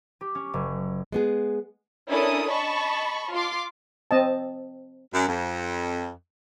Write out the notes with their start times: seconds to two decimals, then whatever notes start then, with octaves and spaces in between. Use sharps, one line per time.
0.21 G4
0.35 C#4
0.54 F#1
1.12 G#3 B3 G#4
2.09 C#4 D4 E4 A4 A#4 D#6
2.50 D#5 A5 B5 C#6
3.32 F4 C6 D6
4.11 C4 D#5 A5
5.14 F#2
5.28 F2